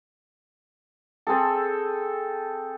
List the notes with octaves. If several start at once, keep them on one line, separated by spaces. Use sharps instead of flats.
C4 G#4 A4